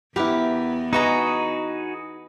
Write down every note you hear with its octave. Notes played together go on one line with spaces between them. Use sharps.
E2 B3 E4 G4 A#4 B4 F#5
D#4 F#4 G#4 B4 D#5 A#5